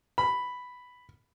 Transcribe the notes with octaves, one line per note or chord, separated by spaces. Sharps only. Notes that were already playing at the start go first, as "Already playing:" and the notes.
B5